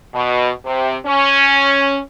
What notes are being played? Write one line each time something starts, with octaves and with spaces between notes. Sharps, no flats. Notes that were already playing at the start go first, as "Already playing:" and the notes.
B2
C3
C#4